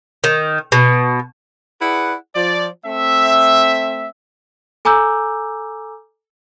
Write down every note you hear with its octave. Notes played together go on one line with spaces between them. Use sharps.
D#3
B2
E4 G#4 B4 D5 F#5
F3 D5
A3 C4 E5
A4 G#5 A#5 D6 E6 G6